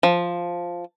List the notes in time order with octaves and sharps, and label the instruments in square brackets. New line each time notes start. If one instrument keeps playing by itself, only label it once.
[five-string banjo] F3